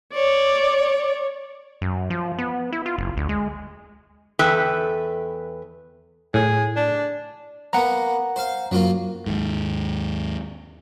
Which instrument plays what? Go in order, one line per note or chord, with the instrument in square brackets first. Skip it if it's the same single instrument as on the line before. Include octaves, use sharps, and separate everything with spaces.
[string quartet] C#5 [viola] D5
[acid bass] F#2
F3
B3
E4
F4
F#1
D2
G#3
[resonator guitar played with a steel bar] E2 A4 B4 E5 G5
[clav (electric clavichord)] A2 [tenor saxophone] G#4
[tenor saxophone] D4
[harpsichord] A#3 B3 [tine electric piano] F#5 A#5
[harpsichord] C5 F5
[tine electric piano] F#2 [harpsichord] F#3 A#3 F4
[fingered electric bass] D#2 G#2